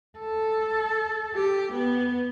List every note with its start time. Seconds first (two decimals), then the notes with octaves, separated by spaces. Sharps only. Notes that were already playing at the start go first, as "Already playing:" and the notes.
0.19 A4
1.34 G4
1.72 B3